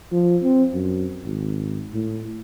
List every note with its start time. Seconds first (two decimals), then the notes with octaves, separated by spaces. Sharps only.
0.12 F3
0.43 C4
0.74 F#2
1.25 G#1
1.93 A2